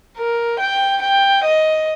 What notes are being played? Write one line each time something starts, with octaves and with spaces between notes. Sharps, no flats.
A#4
G5
G5
D#5